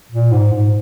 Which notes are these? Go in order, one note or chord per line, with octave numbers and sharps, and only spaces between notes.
A#2
G#2
G#2